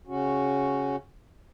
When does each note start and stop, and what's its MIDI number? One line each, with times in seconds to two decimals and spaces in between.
0.07 0.96 49
0.07 0.96 61
0.07 0.96 66